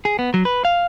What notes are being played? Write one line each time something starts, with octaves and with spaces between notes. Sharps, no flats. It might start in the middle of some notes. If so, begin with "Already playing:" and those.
G#4
B3
F#3
B4
F5